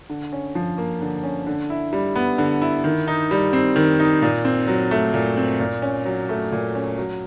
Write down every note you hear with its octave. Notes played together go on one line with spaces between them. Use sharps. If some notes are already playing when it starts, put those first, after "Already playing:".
D3
C#4
F3
A#3
D3
C#4
D3
E4
G3
B3
D3
E4
D#3
D#4
G3
C4
D#3
D#4
A#2
C4
F#3
A3
A#2
C4
A#2
C#4
F#3
A3
A#2
C#4
F#3